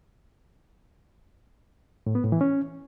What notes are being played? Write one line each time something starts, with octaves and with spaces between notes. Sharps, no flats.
A2
B3
A2
E3
C#4